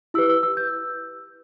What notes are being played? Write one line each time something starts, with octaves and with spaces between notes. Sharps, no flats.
E4 G4 B4 E6
E6
E6
G6